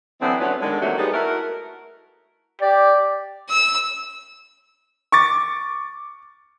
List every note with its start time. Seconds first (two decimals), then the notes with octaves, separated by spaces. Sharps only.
0.21 D3 E3 F#3 B3 C4
0.40 F3 F#3 A3 B3 C#4 D4
0.61 D3 D#3 G#3
0.81 C3 D#3 E3 F#3 A3 A#3
0.98 G3 G#3 B3 D#4 G#4 A4
1.13 A3 E4 F#4 A#4
2.62 G4 D5
3.50 E6
5.12 C#6 D6 A6